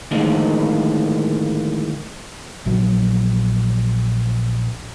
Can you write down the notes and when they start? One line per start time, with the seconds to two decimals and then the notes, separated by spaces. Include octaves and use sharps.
0.11 A2 D3 D#3 F3 G#3 A#3
2.66 A#1 F#3